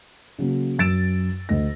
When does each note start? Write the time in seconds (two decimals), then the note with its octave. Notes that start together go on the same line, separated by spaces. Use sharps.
0.39 C#3 F#3 A#3
0.78 F#2 E6 A6 D7 E7
1.49 D2 A3 D#5 A#6